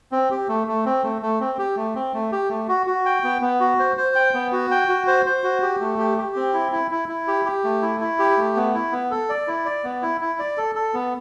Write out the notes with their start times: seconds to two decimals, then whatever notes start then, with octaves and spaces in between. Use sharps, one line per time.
0.12 C4
0.31 G4
0.48 A3
0.67 A3
0.86 C4
1.03 A3
1.22 A3
1.40 C4
1.58 G4
1.77 A3
1.95 C4
2.14 A3
2.32 G4
2.50 A3
2.68 F#4
2.87 F#4
3.06 G5
3.24 B3
3.41 B3
3.60 F#4
3.79 C5
3.97 C5
4.15 G5
4.34 B3
4.52 F#4
4.71 G5
4.89 F#4
5.07 C5
5.26 C5
5.44 F#4
5.62 G4
5.80 A3
5.99 G4
6.18 G4
6.36 C4
6.54 E4
6.72 E4
6.91 E4
7.09 E4
7.28 G4
7.45 G4
7.64 A3
7.82 E4
8.00 E4
8.19 G4
8.37 A3
8.56 B3
8.74 E4
8.92 B3
9.11 A4
9.29 D5
9.48 E4
9.66 D5
9.84 B3
10.02 E4
10.21 E4
10.39 D5
10.58 A4
10.75 A4
10.94 B3